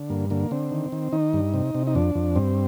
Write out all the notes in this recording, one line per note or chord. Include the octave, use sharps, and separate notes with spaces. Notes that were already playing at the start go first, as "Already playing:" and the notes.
Already playing: D3
G2 A#3
D3 A#3
D3 C4
D#3
D#3
D#3 D#4
G2
C3
C3
D#4
F2 D4
F2
G2 C4